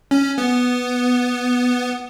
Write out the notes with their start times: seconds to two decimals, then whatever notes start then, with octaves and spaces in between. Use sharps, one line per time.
0.11 C#4
0.38 B3